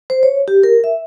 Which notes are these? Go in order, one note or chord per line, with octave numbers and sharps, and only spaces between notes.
C5
C#5
G4
A#4
E5